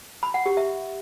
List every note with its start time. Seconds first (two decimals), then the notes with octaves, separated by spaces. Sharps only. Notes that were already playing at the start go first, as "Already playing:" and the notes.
0.23 B5
0.34 F#5
0.46 G4
0.57 E5